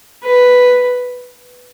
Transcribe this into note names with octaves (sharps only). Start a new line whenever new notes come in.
B4